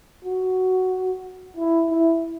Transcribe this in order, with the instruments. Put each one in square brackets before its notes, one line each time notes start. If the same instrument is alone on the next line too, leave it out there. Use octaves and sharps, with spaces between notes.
[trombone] F#4
E4
E4